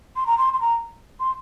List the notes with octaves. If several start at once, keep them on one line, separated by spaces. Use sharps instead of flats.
C6
A#5
C6
C6
A#5
C6